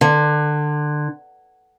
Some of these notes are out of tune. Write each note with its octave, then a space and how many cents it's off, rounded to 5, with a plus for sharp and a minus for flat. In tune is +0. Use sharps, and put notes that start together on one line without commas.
D3 +25